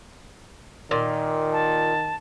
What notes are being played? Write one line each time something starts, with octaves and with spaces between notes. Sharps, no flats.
A#2 D#3
A5